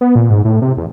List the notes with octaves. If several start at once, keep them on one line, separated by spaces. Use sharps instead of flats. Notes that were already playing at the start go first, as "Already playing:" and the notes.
B3
A#2
G#2
A2
C3
E2